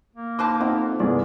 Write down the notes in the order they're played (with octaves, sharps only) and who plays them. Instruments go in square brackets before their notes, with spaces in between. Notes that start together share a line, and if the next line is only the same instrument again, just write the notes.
[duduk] A#3
[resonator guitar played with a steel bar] D#4 C5 A5 [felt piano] B5 D6 F#6
[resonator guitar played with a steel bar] A3 [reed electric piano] C4 D#4 F4 [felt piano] F#5
[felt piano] C2 G2 [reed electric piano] B3 G#4 D5